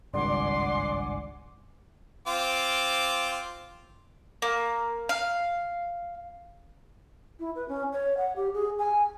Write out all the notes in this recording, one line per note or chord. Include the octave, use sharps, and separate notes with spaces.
G#1 C#2 G2 D5 F#5 G#5 C6 D6
C4 F4 D6
A#3
F5
E4
B4
C#4
C#5
F#5
G4
G#4
G#5